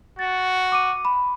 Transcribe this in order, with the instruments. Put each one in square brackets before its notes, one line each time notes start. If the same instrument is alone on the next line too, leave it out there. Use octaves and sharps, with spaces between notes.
[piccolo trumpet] F#4 [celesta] A6
[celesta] D6 D#7
B5